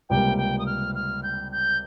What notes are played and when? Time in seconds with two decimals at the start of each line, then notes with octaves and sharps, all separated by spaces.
0.10 C#2 C3 G3 A#3 G5
0.38 G5
0.59 D#6
0.66 F6
0.95 F6
1.23 G6
1.52 G6